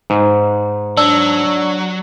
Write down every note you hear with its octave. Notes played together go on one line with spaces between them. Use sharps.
G#2
F#3 D4 E6